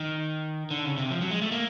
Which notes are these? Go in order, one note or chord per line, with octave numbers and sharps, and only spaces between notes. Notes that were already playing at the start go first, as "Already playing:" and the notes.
Already playing: D#3
D3
C#3
C3
F3
F#3
G#3
A3
A#3